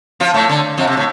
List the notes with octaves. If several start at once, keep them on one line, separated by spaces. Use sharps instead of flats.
F3 F4
A2 A3
D3
F2 F3
C3
A2